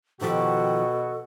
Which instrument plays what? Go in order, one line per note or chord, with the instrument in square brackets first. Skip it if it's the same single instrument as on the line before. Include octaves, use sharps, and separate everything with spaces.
[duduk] B2 [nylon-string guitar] D#3 F3 G4 [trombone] F#4 [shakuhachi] A4